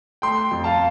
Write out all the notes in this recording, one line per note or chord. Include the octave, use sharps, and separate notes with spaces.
A3 G5 C6
F2
F5 A5